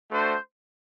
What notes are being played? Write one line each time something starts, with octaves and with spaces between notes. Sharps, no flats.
A3 D4 F#4 C5